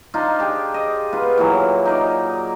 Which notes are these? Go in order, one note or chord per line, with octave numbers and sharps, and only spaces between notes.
D4 D#4 F4
D4 G4 G#4
D#5
B3 F4 B4
A#2 E3 F#3
D#4 D5